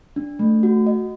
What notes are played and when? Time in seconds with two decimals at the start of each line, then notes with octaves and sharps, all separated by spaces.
0.16 D4
0.39 A3
0.63 F#4
0.86 D#5